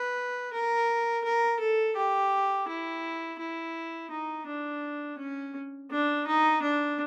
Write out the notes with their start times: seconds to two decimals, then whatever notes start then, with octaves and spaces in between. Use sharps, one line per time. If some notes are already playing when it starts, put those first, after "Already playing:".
Already playing: B4
0.53 A#4
1.24 A#4
1.59 A4
1.96 G4
2.68 E4
3.39 E4
4.11 D#4
4.47 D4
5.18 C#4
5.91 D4
6.27 D#4
6.62 D4